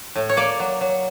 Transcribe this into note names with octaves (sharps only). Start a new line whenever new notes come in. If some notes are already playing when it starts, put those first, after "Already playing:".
A2
C#5
A#3 D5
F#3
F#3